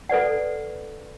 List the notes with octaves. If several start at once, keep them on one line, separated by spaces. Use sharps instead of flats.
A4 B4 D5 F#5